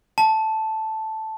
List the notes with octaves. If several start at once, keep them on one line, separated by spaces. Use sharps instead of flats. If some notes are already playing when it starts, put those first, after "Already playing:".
A5